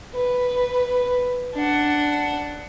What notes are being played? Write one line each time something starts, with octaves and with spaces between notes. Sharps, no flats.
B4
D4 F#5